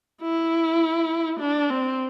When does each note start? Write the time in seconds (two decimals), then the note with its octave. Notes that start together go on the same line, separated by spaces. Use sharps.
0.22 E4
1.40 D4
1.70 C4